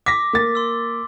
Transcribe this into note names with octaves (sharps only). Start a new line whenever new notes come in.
D6 A#6 B6
A#3 A6
C6 E6